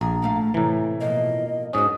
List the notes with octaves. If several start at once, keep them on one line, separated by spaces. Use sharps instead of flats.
A#1 G#4 A#5
A2 A3 F5
A2 C3 E3
B2 F3 A#3 D#5
G#2 C#4 D4 F#4 D#6